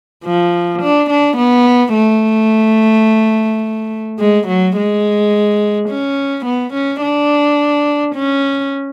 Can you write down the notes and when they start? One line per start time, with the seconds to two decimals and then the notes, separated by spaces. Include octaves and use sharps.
0.25 F3
0.82 D4
1.10 D4
1.37 B3
1.94 A3
4.19 G#3
4.48 F#3
4.77 G#3
5.89 C#4
6.46 B3
6.74 C#4
7.02 D4
8.15 C#4